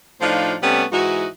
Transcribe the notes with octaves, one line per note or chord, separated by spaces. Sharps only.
A2 F3 D4 D#4 F4 C5
C3 G3 A3 B3 C#4 D5
G#2 E3 D#4 F#4